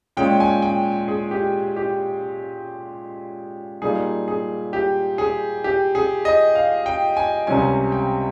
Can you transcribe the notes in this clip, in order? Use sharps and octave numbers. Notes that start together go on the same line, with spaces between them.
A#2 G#3 C#4 G5
G#5
G5
G#4
G4
G4
A#2 G3 A#3 D#4 G#4
G#4
G4
G#4
G4
G#4
D#5
F5
G5
G#5
C#2 C3 G3 C#4 G#5
G5